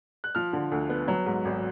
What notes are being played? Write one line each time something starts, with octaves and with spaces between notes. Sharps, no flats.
F#6
F3 F6
D3
D2
B3
F#3
G#2
G#1